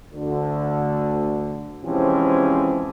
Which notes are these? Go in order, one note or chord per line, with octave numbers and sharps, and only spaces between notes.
D2 D3
C3 E3 F3 G#3 C4 C#4